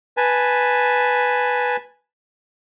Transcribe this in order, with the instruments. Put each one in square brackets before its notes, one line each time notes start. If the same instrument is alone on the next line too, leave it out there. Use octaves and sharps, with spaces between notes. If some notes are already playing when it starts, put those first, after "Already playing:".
[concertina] B4 G#5 A5